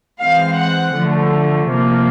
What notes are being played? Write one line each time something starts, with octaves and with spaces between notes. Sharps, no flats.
E3 G#3 C4 F5
F#5
D3 F3 A3
C3 F3 A#3